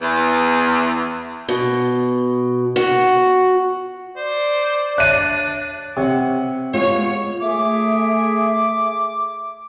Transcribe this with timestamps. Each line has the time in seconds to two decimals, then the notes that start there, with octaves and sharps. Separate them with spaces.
0.02 E2
1.49 B2
2.76 F#4
4.16 C5 D5
4.98 D4 C#5 E5 F#6 D#7
5.97 C3 C#5 F#5
6.74 G#3 B3 F4 C#5
7.42 A3 G#4 E5 D6